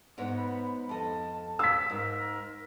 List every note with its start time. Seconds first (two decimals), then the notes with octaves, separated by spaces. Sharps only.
0.18 G#2 B3 C#5 F#5
0.36 B5
0.89 F2 D#5 A5
1.59 F5 E6 B6
1.90 G#2 A#4